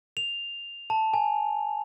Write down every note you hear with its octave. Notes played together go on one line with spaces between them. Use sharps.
F7
A5
G#5